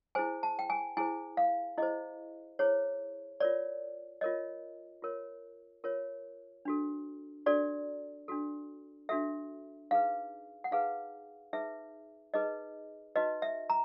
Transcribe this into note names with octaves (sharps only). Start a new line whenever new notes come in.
E4 G#4 C5 G#5
A5
G5
G#5
E4 G#4 C5 G#5
F5
E4 G#4 C5 D#5
E4 G#4 C5 C#5
F4 A#4 C#5 D5
F4 A#4 C#5 D#5
F4 A#4 C#5
F4 A#4 C#5
D4 F#4 A4
D4 F#4 A4 D5
D4 F#4 A4
D4 F#4 A4 E5
D#4 G#4 B4 F5
F#5
D#4 G#4 B4 F5
D#4 G#4 B4 E5
D#4 G#4 B4 D#5
D#4 F#4 B4 D#5
E5
A#5